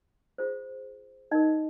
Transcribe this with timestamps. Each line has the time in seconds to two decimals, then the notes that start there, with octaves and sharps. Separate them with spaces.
0.38 F4 G#4 C5
1.31 D#4 A#4 D#5